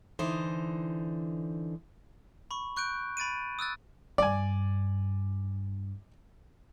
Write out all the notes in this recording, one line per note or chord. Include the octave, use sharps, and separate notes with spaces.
D3 E3 D#4 C5
B5 C#6
C#6 F#6 G6 D7
B5 A6 D7 D#7
D#6 E6 F#6 A6
G2 D5 G#5